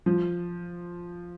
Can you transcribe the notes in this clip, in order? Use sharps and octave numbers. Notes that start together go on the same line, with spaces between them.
F3